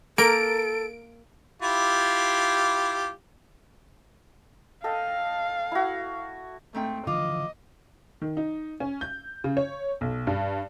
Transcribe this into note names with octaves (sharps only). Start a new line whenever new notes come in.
A#3 A4 A#4 D7
E4 F4 G4
A4 D#5 F5 G5
E4 F#4
G#2 A3 C4 G5
D3 E3 F3 F4 D#5 D6
D#3
D#4
C#4
G6
C#3
C#5
B1
G2